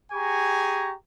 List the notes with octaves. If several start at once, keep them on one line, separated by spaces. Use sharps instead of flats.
G4 G#4 G#5 A#5 C#6